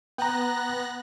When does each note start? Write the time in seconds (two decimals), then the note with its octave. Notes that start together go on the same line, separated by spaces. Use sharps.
0.18 B3 G5 A#5 F#6 A#6